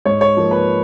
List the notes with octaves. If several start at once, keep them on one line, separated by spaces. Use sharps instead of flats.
G#2 C#5
C#5
F3 A#3
B4